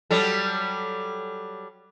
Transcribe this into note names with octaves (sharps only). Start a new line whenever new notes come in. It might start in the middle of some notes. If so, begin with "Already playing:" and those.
F#3 G3 A4